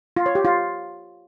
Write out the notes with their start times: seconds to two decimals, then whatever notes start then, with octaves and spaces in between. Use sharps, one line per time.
0.17 F4
0.26 C#5
0.35 G4
0.45 F4